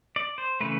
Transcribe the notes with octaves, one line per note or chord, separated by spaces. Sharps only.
D5
C5
C#3 E3 A3 B4